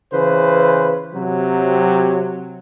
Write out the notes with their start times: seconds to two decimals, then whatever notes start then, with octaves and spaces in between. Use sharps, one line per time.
0.13 C#3 E3 B4 C5
1.14 C3 F#3